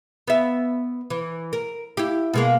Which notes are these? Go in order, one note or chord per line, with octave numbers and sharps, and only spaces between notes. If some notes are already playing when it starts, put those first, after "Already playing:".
B3 E5
E3
A#4
E4 G4
B2 G#3 A#3